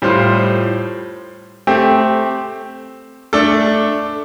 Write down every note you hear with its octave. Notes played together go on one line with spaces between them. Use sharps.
A2 G3 F4 C5
A3 C4 G4
A3 D4 A4